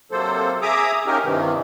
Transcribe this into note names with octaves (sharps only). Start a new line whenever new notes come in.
C3 F#3 A#3 A4 C5
G#4 E5 A#5 D6 D#6
A#3 C#4 D#4 G4 A#4
G2 C3 D#3 E3